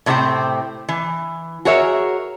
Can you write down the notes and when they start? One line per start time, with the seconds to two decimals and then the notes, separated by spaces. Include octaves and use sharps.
0.06 A2 C3 G3 C4 C5 G5
0.89 E3
1.65 F#4 G#4 A#4 C#5 E5